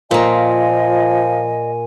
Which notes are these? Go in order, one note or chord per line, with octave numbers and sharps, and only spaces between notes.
A#2 F3 A#3 D#5 G#5